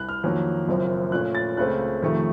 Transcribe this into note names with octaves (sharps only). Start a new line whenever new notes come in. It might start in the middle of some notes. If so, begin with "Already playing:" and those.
Already playing: C2 F#6
F6
F2 D#3 F#3 A#3
F#1 F#2 F3 C4
A#2 A3 C#4 F#6
A6
C#2 C#3 A3 C4 F#6
F2 C3 D#3 A3